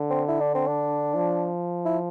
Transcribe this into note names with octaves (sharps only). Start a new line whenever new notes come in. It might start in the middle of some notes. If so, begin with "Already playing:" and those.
Already playing: D3
C4
E4
D4
C4
D4
F3
E4